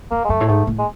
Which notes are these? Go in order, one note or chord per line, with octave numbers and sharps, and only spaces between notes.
F2 A#3
G#3
F#2 A3
A2
G#2 A3
A2
G#3